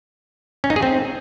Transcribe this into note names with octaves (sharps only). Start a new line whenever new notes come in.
C#4
D#4
G#4
C4